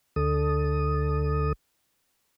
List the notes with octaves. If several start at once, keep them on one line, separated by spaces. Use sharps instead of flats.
D2 D3 A4 D#6